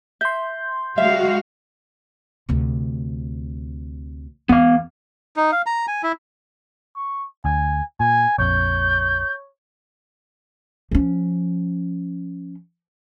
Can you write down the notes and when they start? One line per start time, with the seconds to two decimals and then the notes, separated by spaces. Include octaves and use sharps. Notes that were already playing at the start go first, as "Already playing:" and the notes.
0.21 E5 C6 G6
0.98 G3 G#3 F#4 E5 F5
2.49 D2 C3
4.49 E2 B3 F5
5.36 D#4
5.52 F5
5.66 A#5
5.88 G#5
6.03 E4
6.96 C#6
7.45 D2 G#5
8.00 A#2 G#5
8.39 A#1 F2 C#5 G6
10.91 F3 C#4